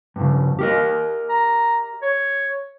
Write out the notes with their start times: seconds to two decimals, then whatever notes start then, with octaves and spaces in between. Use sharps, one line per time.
0.16 G2 C#3
0.59 G4 A#4 D#5
1.29 A#5
2.02 C#5